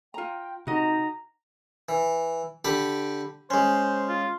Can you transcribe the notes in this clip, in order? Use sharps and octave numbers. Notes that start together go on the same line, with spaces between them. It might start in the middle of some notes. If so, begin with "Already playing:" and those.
F4 G5 A#5
C3 D#4 F#4 D#5 A#5
E3
D3 G4 B5
G#3 C#4 C5
F4